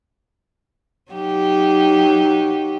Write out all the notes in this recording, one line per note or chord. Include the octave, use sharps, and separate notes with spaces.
F#3 D#4 G4